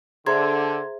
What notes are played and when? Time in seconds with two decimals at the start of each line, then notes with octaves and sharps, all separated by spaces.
0.26 D3 G#4 C5 E5 A#5 C6 G#6